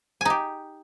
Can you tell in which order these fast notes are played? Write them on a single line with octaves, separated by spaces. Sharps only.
G#5 D#4 G4